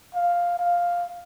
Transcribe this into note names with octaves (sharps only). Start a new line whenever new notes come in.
F5
F5